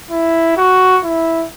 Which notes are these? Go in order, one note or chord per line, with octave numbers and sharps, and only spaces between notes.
E4
F#4
E4